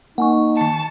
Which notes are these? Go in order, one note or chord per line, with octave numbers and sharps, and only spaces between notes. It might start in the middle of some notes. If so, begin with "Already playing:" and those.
A#3 D#4 F#5 G#5 C#6
D#3 A5 C#7